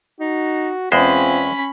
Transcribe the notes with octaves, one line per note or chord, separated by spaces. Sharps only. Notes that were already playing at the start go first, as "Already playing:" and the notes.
D#4 F#4
E2 G#3 C4 C#4 F4 C5 B5